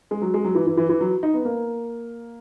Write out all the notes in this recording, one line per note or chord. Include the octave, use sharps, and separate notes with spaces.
G#3
F#3
G#3
F#3
E3
E3
E3
E3
F#3
D#4
B3
A#3